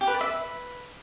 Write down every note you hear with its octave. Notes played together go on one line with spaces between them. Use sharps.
G4
B4
D5
E5
B4